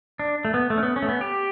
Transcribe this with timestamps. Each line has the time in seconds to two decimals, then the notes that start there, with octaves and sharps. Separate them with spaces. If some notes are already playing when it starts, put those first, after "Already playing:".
0.20 D4
0.45 A3
0.54 B3
0.70 A3
0.78 C#4
0.83 B3
0.96 C#4
1.02 A3
1.09 B3
1.21 G4